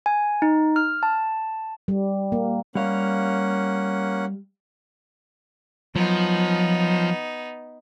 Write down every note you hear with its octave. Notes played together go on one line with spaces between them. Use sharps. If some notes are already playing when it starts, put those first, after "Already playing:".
G#5
D#4
F6
A5
G3
A#3
G3 A#3 C#4 F5 F#5
F3 F#3 B3 D#4